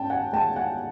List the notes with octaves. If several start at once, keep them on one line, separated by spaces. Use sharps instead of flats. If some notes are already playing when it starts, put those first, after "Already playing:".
Already playing: G#2 C#4 G5 A5
F#5 G#5
G#3 G5 A5
F#5 G#5